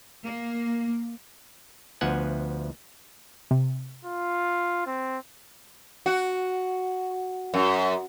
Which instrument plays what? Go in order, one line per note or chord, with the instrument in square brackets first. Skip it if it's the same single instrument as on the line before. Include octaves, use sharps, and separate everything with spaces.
[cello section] A#3
[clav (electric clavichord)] D2 F3 B3 F#5 G#5
[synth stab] C3
[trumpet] F4
C4
[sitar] F#4
F#2